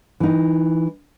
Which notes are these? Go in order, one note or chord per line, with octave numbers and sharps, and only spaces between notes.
E3 D#4